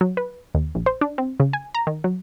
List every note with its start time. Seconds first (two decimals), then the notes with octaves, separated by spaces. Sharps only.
0.01 F#3
0.17 B4
0.55 D#2
0.75 A#1
0.86 C5
1.01 D4
1.18 C4
1.40 C#3
1.53 G#5
1.75 A#5
1.87 D#3
2.04 F#3